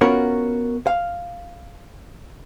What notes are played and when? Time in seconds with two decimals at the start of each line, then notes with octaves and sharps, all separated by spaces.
0.01 B3 C#4 F4 F#4 A#4 C#5
0.87 F5